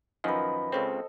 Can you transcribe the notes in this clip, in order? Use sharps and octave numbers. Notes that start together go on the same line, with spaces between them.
F#2 D#3 F3 B4 D#5
C#2 C#3 C4 A4 C5